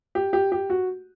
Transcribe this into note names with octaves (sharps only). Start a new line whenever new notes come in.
G4
G4
G4
F#4